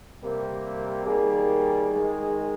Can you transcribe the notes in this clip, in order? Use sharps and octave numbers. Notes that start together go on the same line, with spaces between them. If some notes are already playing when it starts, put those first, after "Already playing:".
C3 G3 A#3 A#4
D#3 G3 A#3 G#4
D#3 G#3